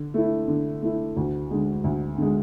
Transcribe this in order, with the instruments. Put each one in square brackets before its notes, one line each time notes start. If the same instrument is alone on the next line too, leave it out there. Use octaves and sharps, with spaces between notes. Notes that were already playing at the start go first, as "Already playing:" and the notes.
Already playing: [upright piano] D3
A3 E4
D3
A3 E4
D2
D3 G#3
D2
D3 G#3